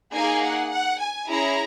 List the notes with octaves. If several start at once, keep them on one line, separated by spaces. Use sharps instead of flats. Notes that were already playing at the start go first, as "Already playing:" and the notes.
A#3 D#4 G#4 G#5
F#5
F#5
G#5
C#4 E4 G#4 A#5